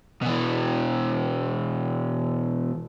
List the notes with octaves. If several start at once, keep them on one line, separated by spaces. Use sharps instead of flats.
B2 E3